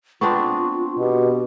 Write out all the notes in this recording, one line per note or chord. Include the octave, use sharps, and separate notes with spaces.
B3 C4 D4 F4 C6 C#6
B2 G4